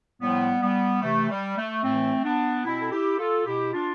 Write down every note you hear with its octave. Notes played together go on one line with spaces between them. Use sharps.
A2 F3 G3 B3
G3 B3
C3 E3 A3
G3
A3
A2 E3 A3 C4
B3 D4
B2 C4 E4
A4
E4 G4
F4 A4
B2 E4 G4
D4 F4